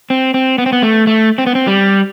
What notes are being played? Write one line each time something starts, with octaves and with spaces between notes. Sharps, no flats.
C4
C4
B3
C4
B3
A3
A3
C4
B3
C4
G3